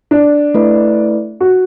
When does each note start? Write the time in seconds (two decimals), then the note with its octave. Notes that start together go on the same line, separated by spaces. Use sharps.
0.11 D4
0.54 A3 E4 B4 D5
1.40 F#4